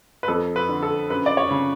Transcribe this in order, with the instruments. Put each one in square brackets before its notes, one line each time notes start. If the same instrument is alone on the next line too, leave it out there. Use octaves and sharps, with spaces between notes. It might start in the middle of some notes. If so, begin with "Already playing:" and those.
[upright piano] B4
F2 A4
B4
D3
A4
F#2 B4
D5
C#5
C#3